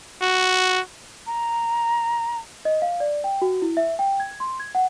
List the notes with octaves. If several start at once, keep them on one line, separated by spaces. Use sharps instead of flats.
F#4
A#5
D#5
F5
D5
G5
F#4
E4
E5
G5
G#6
C6
G#6
F#5